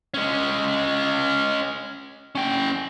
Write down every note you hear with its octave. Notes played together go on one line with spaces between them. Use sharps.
G#3 C#4
C#4 G5